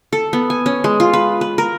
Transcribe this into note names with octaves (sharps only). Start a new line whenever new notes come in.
A4
B3
G#5
C#4
G#3
F4
B4
B4
A#4